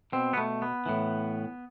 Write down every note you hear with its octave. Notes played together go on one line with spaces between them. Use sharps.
B2 C4
B3
A3
B3
A2 E3